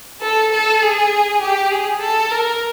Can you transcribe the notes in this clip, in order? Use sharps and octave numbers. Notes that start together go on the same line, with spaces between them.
A4
A4
G#4
G4
G#4
A4
A#4